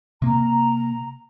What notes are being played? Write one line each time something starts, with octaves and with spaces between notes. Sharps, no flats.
C3 A#3 A#5